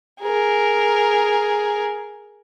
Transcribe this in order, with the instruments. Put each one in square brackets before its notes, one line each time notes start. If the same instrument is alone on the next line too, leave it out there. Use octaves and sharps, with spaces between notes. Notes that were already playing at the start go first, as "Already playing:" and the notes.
[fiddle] G#4 A#4